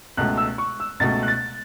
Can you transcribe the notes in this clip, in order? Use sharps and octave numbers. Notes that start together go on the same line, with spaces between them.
C#2 B2 A3 F#6
E6
C#6
E6
C#2 B2 A3 A6
F#6
A6